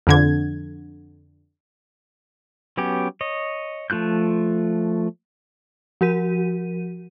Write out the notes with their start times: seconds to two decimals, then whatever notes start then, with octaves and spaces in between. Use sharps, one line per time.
0.07 F2 D3 G#6
2.77 F#3 B3 C#4 G4
3.21 C#5 D#5
3.90 F3 A3 F4 F#6 G6
6.01 F3 F#4 A#4 D#7